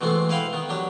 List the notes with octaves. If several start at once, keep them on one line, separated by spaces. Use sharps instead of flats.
B2 E3 G#3 A3 B3 C4
E4 B4 F5 G5 B5
D#3 B3
F#3 D4 G4